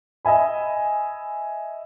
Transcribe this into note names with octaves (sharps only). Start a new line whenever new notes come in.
D#5 E5 G#5 B5